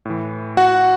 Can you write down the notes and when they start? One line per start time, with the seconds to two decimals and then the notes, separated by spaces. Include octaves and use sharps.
0.05 A2 E3
0.57 F#4 F#5